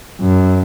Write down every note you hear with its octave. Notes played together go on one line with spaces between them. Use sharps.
F#2